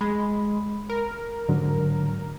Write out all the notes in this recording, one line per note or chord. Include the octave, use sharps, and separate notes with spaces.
G#3 B5
A#4
G#2 D3 F#3